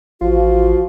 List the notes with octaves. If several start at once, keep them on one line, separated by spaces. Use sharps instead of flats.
A1 F3 F4 F#4